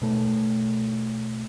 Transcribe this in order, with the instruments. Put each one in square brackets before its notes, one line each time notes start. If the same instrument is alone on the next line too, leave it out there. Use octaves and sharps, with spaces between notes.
[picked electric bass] B2 A3